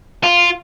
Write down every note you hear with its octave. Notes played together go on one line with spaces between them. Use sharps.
F4